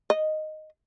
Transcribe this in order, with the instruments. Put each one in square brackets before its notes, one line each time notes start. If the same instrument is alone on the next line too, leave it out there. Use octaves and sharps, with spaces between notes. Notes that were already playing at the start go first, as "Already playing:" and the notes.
[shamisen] D#5